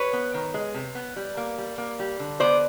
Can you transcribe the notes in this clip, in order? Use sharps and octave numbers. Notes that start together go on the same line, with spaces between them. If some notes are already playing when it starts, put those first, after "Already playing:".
Already playing: B4 C#5
B3
D#3
G#3
C3
B3
G3
A#3
G3
A#3
G3
D3
B3 C5 D5